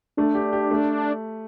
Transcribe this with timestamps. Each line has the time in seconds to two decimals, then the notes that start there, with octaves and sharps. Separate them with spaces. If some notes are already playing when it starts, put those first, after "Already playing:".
0.17 A3 D4
0.35 G4
0.53 G4
0.71 A3